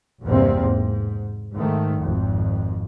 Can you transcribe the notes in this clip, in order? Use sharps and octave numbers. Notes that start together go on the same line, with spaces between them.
A#1 E2 G2 C3 A#3 C4
G#2
G#2 D#3 A3
G#1 F2